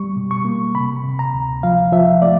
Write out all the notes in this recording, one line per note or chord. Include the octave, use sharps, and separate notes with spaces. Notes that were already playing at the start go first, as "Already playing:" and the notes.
Already playing: G3 C#6
B2
C#6
A#3
C3 B5
C3
A#5
D2
F3 F5
F3 E5
A3 D5